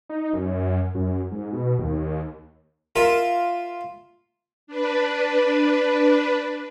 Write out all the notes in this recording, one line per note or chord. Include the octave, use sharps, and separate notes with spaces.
D#4
F#2
F#2
G#2
B2
D#2
F4 A#4 E5
D4 B4